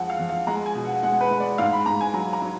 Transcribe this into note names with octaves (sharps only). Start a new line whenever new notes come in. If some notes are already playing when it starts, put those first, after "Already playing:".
Already playing: F2 G#3 F#5
F5
F2
F5
G#3 A#5
G#5
B2
F#5
G#3 F#5
B4
G#3
D5
G#2 F5
B5
G#2 A#5
G#5
F#3 A#5
A#5
F#3